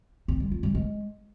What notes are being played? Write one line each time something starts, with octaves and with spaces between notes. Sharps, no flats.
C4
G3
F4
G3
G#3